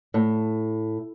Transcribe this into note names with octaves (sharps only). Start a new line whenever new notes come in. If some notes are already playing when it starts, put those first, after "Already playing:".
A2